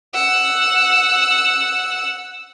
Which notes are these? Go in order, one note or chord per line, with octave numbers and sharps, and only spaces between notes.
F#5 E6